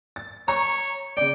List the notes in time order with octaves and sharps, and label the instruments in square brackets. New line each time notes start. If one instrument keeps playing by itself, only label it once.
[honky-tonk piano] A6
[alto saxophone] C#5 [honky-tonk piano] A#5 C#6
[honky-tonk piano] C#3 D5 [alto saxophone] G5